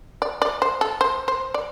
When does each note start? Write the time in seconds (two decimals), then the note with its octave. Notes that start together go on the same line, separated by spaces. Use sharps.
0.22 D5
0.42 D5
0.62 C5
0.81 A4
1.01 C5
1.28 C5
1.54 D5